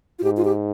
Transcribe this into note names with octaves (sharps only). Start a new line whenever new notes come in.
F4
G#2 G4
F4
G4